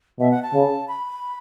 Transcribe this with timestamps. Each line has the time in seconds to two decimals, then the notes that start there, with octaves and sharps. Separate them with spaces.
0.20 B2 E5
0.31 F#5
0.43 A5
0.54 C#3
0.88 B5